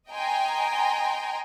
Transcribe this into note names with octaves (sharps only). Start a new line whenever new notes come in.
D#5 G5 G#5 A#5 C6